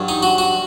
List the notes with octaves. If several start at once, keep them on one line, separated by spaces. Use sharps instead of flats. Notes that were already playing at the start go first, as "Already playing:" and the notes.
Already playing: G2 F#3
D#4
F#4
F#4